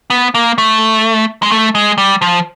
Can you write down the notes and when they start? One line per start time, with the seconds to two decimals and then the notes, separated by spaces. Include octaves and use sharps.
0.10 B3
0.35 A#3
0.58 A3
1.43 G#3
1.51 A3
1.75 G#3
1.98 G3
2.22 F3